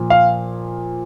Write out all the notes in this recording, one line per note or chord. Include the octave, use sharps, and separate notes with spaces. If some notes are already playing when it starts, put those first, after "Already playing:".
Already playing: A#2 F3
F5